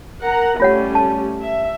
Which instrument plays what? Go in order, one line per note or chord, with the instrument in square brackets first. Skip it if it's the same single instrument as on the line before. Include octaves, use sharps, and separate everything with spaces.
[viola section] A#4 F#5 A#5
[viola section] G3 A3 C#4 [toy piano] F4 C#5 F#5
[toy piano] A5
[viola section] E5